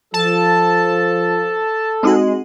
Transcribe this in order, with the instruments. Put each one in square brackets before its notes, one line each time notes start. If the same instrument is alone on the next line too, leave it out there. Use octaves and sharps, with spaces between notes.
[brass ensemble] F3 [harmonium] A4 [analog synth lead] A5
[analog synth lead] G#3 [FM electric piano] C4 D#4 F#4